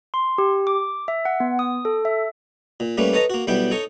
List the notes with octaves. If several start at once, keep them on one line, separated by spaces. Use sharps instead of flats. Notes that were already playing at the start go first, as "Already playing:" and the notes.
C6
G4
D6
E5
F#5
B3
D#6
A4
E5
A#2
G3 A3 A#3 C#4 B4
A4 B4 C#5 D#5 A5 A#5
A#3 F#4
B1 G3 B3 E4 G5 B5
D#4 A4 C#5 D#5 C#6